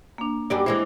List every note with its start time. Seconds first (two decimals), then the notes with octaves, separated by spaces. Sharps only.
0.18 A#3 D4
0.50 F#2 G3 D5
0.66 E3 G#3 E4 C5 D6